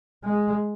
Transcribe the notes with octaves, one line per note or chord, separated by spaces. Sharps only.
G#3